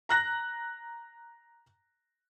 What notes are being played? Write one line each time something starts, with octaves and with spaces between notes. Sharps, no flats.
A#5 F#6 A#6